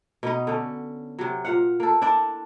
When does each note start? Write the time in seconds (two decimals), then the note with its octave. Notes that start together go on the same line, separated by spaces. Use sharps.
0.23 B2 B3 D#4
0.47 D3 C#4
1.19 C3 F#3
1.45 A#2 F5 F#5
1.80 A#3 A4
2.02 D4 E4 D5